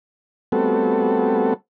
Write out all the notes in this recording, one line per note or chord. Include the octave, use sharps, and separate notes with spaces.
G3 A3 B3 C4 F#4 A4